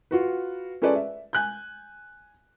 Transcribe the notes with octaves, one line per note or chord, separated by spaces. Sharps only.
F4 F#4 B4
C#4 F4 G#4 A4 B4 D5
E5
G#5 F#6 G6